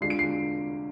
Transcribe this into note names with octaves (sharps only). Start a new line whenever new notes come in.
D3 G#3 D4 F4 C7
D7
C7